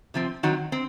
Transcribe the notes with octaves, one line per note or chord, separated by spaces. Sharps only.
C3 F3 C4
D#3 F#3 C4 F#4
C4